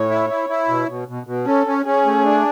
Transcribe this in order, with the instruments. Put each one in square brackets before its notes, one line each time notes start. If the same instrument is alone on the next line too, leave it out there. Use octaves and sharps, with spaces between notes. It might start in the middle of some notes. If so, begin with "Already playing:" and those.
Already playing: [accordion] A2 [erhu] C#5
[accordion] E4
E4
E4
B2
B2
B2
B2
[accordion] C#4 [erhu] A4
[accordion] C#4
[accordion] C#4 [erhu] G#4
[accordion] A3
D4